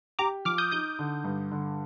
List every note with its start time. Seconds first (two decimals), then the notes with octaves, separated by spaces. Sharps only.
0.19 G4 A#5 D6
0.45 F3 D6 F6
0.58 D#6 G6
0.71 D#4 D#6 G6
0.99 D3
1.24 G2
1.52 D3